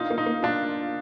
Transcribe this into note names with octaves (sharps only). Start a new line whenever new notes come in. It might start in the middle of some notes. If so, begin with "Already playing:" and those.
Already playing: A#3 D4 D#4 F4
A#3
D#4
A#3
D4 F4